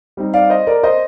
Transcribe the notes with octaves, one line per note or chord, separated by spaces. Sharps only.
G3 C4 D#4
D5 F5
C5 D#5
A#4 D5
C5 D#5